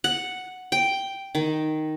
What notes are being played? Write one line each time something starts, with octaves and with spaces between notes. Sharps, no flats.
F#5
G5
D#3